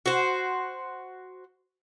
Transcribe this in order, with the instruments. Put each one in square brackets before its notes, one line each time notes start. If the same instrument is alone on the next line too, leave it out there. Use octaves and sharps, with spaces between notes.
[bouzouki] F#4 C5